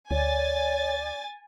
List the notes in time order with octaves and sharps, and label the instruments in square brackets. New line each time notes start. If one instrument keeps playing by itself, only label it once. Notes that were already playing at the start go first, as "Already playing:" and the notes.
[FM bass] D2 [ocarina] C#5 [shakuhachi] D5 [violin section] G#5 A6